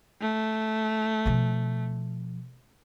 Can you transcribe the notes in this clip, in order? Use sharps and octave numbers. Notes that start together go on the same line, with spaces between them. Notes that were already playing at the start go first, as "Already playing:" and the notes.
A3
B2 F3